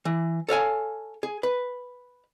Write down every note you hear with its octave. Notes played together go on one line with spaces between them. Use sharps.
E3
A4 C#5 F5 G#5
G#4
B4